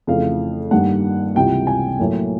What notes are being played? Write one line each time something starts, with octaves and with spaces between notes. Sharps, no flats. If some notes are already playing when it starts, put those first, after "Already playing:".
F2 C#3 E3 A3 F5
G2 D#3 G3 A#3 F#5
C#2 C3 E3 G3 G5
G#5
A2 F#3 A#3